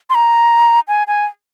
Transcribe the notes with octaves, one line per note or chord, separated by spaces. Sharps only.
C6
A#5
G#5
G#5